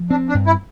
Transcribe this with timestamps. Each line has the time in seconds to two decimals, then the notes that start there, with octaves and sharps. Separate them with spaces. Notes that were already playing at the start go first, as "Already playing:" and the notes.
Already playing: F3
0.10 C4 D4
0.29 D4
0.34 G2
0.46 E4